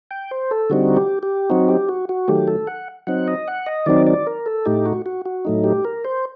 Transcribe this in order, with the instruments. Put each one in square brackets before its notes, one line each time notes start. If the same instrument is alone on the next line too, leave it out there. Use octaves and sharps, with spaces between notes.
[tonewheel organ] G5
C5
A4
D3 G3 C4 D#4 F#4
G4
G4
F#3 C4 D#4 F#4
G4
F#4
F#4
D#3 F#3 A3 G4
A4
F#5
F#3 C4 D#4 F#5
D#5
F#5
D#5
D#3 F#3 C4 D#4 D5
D5
A#4
A4
A2 A3 D#4 G4
F#4
F#4
F#4
A2 F#3 A3 D#4
G4
A#4
C5